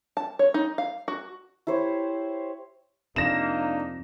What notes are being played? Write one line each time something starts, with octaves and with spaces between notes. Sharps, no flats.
A5
C#5
D#4
F5
F#4
E4 G4 C5 C#5
F2 C3 A#3 D4 D#4 A#6 E7